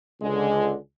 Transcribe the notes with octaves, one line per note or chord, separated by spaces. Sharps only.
C#2 D3 G#3